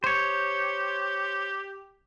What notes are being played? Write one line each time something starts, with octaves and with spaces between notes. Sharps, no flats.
G4 C5 C#5